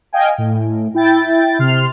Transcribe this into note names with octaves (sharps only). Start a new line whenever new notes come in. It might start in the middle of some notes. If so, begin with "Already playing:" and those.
D#5 F5 G5 G#5
A2
E4 G5 A6
C3 C6 F6